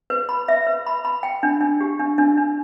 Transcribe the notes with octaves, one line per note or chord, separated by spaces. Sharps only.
B4
B5
E5
B4
B5
B5
G5
D4
D4
G4
D4
D4
D4